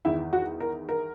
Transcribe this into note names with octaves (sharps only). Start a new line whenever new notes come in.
E2 D#3 E4
F#4
A#4
A#4